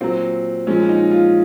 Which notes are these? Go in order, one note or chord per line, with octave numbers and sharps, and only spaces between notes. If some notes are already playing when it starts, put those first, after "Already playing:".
A#2 F#3 C4
A#2 F3 G#3 C#4
D#4
F4